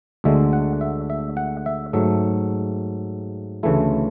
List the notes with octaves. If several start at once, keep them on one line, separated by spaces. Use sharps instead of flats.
D2 D3 G#3 E5
F#5
E5
E5
F#5
E5
G#2 F#3 A3 E5
D2 C#3 E3 A3 E4